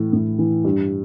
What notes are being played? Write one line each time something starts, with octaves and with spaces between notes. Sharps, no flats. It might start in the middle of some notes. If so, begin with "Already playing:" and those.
Already playing: A2 E3
A2
E3
G2